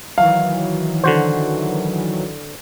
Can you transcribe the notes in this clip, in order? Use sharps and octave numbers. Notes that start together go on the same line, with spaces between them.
D#3 E3 F#3 F5
D3 F#4 C5